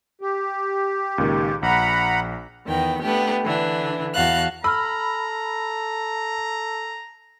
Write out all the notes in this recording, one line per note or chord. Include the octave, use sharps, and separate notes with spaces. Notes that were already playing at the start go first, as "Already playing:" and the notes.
G4
C#2 A#2 D#3
A#1 F#5 A#5 B5
E2 D#3 B3 G5
A3 B3 D4 G4
D3 E3 D4
E2 F#4 F5 A5 F#6
A4 A#5 B5 E6 F6